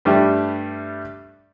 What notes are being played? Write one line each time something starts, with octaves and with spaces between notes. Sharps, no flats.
G2 G3 A3 G4 E5